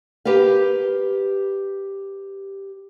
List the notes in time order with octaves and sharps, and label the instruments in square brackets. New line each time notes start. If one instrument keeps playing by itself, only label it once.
[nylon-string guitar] G4 A#4 B4 F5